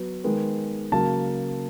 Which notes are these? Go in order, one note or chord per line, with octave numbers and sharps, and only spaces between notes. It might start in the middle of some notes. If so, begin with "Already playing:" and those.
Already playing: F#3 B3
D#3 G#3 B3
C#3 F#3 A#3 A5